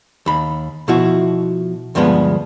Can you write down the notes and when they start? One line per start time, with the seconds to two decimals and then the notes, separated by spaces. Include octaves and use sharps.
0.26 D#2 B5
0.88 B2 F3 E4 F#4
1.95 D2 G2 F3 G#3 B3